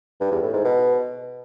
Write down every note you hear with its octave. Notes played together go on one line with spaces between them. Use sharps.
G2
E2
A2
G#2
B2